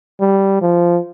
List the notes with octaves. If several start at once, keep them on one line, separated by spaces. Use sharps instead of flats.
G3
F3